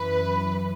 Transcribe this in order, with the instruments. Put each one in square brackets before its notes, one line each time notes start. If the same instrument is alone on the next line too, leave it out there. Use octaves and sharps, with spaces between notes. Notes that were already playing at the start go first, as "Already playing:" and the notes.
Already playing: [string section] F#2 E3 B4